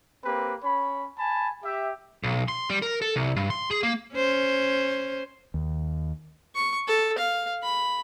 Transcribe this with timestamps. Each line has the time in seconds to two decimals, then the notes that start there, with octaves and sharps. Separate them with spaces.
0.25 A#3 C4 G4 B4
0.63 C#4 C#5 B5
1.18 G#5 A5 B5
1.64 G4 E5
2.23 B1
2.48 C6
2.70 G3
2.82 A#4
3.02 A4
3.16 C2
3.36 G2
3.50 C6
3.71 G#4
3.83 A#3
4.15 C#4 C5
5.54 D#2
6.56 C#6
6.87 A4
7.18 F5
7.63 B5